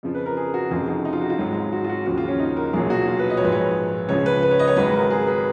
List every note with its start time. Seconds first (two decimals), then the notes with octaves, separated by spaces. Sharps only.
0.03 F2 C#3 F3
0.15 B4
0.26 A#4
0.37 G#4
0.54 F#4
0.71 F1 F2 C#3 F4
0.87 D#4
1.05 D#4
1.13 F4
1.21 F#4
1.30 F4
1.39 G#1 G#2 F#3
1.72 F#4
1.84 F4
1.89 F#4
2.06 D#2 C#3 F3 F#4
2.17 F4
2.28 C#4
2.39 D#4
2.57 A#4
2.73 B1 A#2 F#3 G#4
2.90 F#4
3.07 F4
3.19 B4
3.30 D#5
3.37 C#5
3.41 A#1 G#2 F3 B4
3.52 C#5
4.09 C#2 C#3 F3 C#5
4.26 B4
4.43 B4
4.51 C#5
4.59 D#5
4.68 C#5
4.76 G#1 G#2 F#3 B4
4.93 A#4
5.10 G#4
5.27 B4